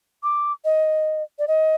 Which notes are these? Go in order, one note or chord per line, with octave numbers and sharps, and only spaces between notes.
D6
D#5
D5
D#5